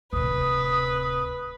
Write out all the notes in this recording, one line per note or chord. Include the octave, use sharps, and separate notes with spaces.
D1 C3 B4 D#6